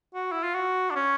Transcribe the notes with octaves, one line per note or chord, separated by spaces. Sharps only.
F#4
E4
F4
F#4
D4
C#4